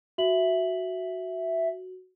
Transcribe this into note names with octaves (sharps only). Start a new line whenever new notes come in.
F#4 E5 F#7